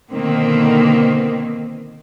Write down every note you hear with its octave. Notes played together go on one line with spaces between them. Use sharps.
B2 D3 D#3 A#3 C4